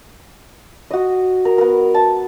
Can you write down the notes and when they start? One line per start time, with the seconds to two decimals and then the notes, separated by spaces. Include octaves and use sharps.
0.91 F#4 D#5
1.45 A#4
1.58 B3 A#4
1.94 A5